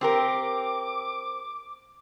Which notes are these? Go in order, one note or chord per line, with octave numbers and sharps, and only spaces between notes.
C4 G4 A#4 D6